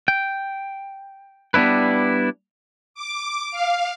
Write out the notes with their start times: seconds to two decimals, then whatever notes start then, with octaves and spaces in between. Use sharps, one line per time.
0.08 G5
1.54 G3 B3 D4 E4 B4
2.94 D6
3.51 F5